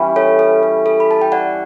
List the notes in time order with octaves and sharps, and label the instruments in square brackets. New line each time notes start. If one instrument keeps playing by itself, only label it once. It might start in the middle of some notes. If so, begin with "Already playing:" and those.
Already playing: [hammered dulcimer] E3 G3 C#4 E4
[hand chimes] A4 C#5
A4
A4
A4
B5
A5
G5
D5 F#5